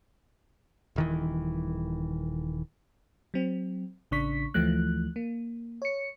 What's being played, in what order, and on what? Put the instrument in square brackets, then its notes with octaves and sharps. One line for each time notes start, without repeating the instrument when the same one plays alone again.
[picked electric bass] D#1 D#3 E3
[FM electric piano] F#3 C4
A1 C#3 D4 C#6 B6
D2 E3 F3 A3 F#6
A#3
C#5 C#7